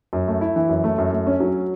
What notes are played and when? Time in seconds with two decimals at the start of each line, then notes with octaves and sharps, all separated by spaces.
0.13 F#2
0.28 A3
0.41 E4
0.56 E3
0.69 F#2
0.84 A3
0.98 F#2
1.13 A3
1.27 C#4
1.40 F#3